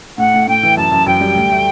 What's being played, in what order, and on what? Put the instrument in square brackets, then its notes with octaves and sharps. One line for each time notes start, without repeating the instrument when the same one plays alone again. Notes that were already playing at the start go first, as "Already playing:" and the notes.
[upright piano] A2 [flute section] F#5
[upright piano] A2
[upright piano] A2 [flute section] G5
[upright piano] E3
[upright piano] F#2 [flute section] A5
[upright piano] F#2
[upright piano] F#2 [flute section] G5
[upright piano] G3
D2
A3